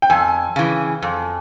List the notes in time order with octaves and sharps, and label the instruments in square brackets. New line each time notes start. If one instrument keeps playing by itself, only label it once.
[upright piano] G5
[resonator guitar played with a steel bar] F2 [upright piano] G#5
[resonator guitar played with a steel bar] C#3 E3
F2